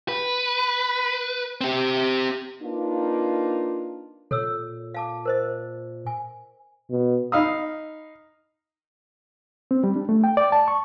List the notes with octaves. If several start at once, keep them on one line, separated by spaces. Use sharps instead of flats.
B4
C4 G4
A#3 D4 D#4 F4 B4
A#2 A4 C#5 E6
F5 A5 D6
A#4 C5 D#5
G#5
B2
D#4 F5 B5 D#6
C4
G3
D4
A3
G5
D5
A5
C#6